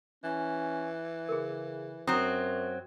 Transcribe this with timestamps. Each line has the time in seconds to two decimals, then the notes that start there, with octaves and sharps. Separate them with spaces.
0.24 E3 C#4
1.29 C#3 G#4 A#4
2.07 F#2 F#3 C4 A#5 D#6